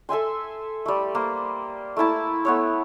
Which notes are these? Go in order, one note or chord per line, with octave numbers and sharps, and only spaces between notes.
A4 E5 G#5 C6
G3 A3
A#3 C5
A3 A#3 E4 A5
A3 B3 C#5